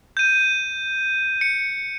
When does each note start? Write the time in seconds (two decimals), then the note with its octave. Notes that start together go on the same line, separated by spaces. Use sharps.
0.17 G6 D#7
1.41 C#7